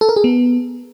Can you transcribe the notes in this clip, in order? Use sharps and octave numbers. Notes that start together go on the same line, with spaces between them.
A4
A#4
G#4
B3